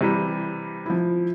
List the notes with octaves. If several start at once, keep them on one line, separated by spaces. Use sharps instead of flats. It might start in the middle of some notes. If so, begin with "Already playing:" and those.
C3 E3 G3
F3 E4